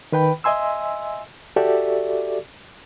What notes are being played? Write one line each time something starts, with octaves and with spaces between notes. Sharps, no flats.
D#3 B4 G5 B5
D#5 E5 G#5 C6 E6
F#4 G4 A4 D5 E5